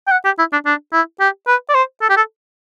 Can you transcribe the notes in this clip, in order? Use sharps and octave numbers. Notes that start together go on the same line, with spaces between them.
G5
F#5
G4
E4
D4
D4
E4
G4
B4
D5
C5
A4
G4
A4